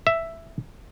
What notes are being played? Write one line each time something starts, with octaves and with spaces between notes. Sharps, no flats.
E5